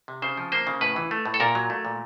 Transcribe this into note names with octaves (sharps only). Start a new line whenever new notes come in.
C3
C#3 C5
F3
A#3 C5
C#3
A2 B4
E3
A3
A2
A4
A#2 A#4
F#3
A3
A#2